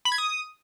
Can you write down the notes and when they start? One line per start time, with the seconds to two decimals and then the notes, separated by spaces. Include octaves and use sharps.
0.05 B5
0.12 G#6
0.18 D#6